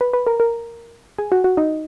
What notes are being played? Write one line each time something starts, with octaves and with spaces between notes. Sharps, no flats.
B4 B5
B4 B5
A#4 A#5
A#4 A#5
G#4 G#5
F#4 F#5
F#4 F#5
D#4 D#5